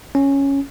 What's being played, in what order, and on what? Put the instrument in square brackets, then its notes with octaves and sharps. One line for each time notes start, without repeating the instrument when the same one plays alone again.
[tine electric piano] C#4